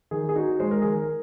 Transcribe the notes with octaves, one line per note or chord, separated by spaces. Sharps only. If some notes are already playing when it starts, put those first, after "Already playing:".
D#3 G#4
G#4
D#4 F#4
G#3 C5
A#4
D#3 G#4
A#4